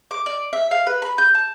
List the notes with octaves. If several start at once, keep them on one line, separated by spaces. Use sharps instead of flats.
D6
D5
E5
F5
B4
B5
G6
A5